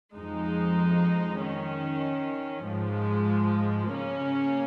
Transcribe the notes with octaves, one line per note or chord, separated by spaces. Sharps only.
F2 F3 G#3 D#4
D#3 C#4
G#2 F3 G#3
C#3 A#3 C#4